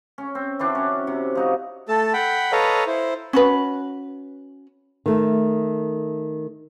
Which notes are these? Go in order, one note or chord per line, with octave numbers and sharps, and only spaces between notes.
C#4
C4
E3 C4 D4 F#4
C#4
C3
F3 D#4 F#4
A3 A4 A5
F#5 G5 B5
A4 B4 C#5 D#5 F5 A#5
E4 C5
C#4 F#4 B4
D#3 A3